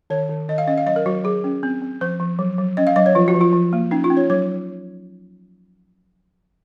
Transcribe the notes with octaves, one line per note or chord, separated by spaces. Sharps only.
D#3 C#5
D#3
D#3 D#5
F5
C#4 D#5
F5
F#3 D#5
A#4
F#3 F#4
F#3 G#4
C#4
C4
C4
F3 C5
F3
F#3
F#3
C#4 D#5
F5
F#3 D#5
C#5
F3 F4
F#4
F3
F4
F3
A#3
C#4 D#4
F4
C#4
C#5
F#3 C#5